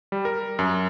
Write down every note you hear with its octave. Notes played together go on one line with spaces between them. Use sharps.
G3
A#4
F#2